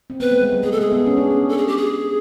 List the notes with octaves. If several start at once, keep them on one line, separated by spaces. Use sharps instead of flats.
C4
B3 B4
A3
G#3
G3
G#3 G#4
A4
A3
G#4
B3
C#4
D4
C#4
A4
G#4
G4
G#4